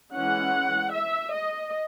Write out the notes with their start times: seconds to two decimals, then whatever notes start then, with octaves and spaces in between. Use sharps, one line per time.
0.15 E3 G#3 C#4 F#5
0.94 E5
1.34 D#5